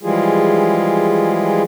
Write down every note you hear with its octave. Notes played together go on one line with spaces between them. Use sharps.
E3 F3 G3 G#3 F4 G#4